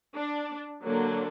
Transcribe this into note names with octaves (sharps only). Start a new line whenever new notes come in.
D4
D3 F#3 A#3 D4